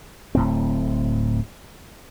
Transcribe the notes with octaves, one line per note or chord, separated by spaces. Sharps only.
D1 A2 C4